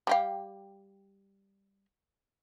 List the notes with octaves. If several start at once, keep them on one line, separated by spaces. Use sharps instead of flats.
G3 G4 F5